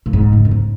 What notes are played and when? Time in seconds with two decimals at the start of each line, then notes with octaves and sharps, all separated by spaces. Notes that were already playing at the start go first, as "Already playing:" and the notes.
0.06 A#2
0.13 G#2
0.32 C#3
0.45 F#2
0.51 G#2